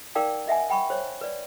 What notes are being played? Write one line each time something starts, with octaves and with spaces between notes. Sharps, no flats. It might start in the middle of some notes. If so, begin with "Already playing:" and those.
D#4 A#4 D5 F5 G5 D6
D#5 E5 F#5 G#5
F#5 G5 B5 C#6
C5 C#5
B4 D5